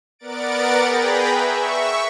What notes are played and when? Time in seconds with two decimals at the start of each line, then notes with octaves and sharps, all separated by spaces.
0.19 B3 A#4 D5 F#5 A6 D7
0.78 G#4 B4 G5 A#5 B5
1.32 E5 C#6